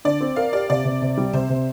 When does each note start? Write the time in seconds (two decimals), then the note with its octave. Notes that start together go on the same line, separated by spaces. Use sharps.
0.05 D3 D5
0.21 C4
0.36 A#4 F5
0.53 G4 D5
0.70 C3 D5
0.85 C3
1.02 C3
1.18 G3
1.33 C3 C5
1.49 C3